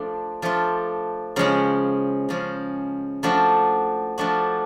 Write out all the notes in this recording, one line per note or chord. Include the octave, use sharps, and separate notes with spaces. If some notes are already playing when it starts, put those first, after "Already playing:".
Already playing: F3 A3 D4 F4
F3 A3 D4 F4
C#3 F3 G#3 C#4
C#3 F3 G#3 C#4
F3 A3 D4 F#4
F3 A3 D4 F#4